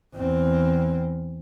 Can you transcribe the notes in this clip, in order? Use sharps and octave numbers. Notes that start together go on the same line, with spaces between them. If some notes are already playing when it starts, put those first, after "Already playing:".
E2 C4